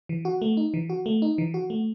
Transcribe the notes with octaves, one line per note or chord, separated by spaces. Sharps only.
E3
F#4
A3
D#4
E3
F#4
A3
D#4
E3
F#4
A3